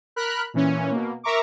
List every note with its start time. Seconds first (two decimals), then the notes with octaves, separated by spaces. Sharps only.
0.16 A#4 B5 F6 F#6
0.54 A#2 E3 C#4
0.91 B2 A#3
1.23 A#4 E5 A#5 C#6 D6